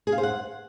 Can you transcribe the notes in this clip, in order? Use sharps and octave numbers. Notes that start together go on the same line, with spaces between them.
G#4
F5
C5
F#5